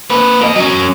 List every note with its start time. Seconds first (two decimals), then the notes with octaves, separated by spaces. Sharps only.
0.10 A#3 B4
0.41 A#3 D#5
0.56 F#3 C#4